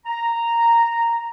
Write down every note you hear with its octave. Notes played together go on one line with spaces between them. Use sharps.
A#5